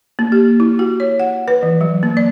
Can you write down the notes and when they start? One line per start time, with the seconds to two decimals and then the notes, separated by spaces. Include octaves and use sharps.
0.19 A#3
0.32 G4
0.60 E4
0.79 F#4
1.00 C#5
1.20 F#5
1.48 B4
1.63 E3
1.81 F#3
2.03 A#3
2.17 D5